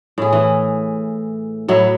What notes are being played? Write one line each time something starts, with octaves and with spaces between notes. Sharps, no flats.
A2 G#4
E3
A2 F#3 E4